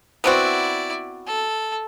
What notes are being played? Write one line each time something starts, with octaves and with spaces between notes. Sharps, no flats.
B3 C4 E4 F#4 D5
A4